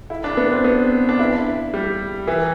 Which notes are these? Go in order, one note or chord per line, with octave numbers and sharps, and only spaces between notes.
E4
D4
B3
C4
B3
D4
E4
G3
E3